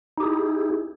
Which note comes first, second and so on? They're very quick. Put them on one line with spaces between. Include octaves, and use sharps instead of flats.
D#4 G4 G#4 E4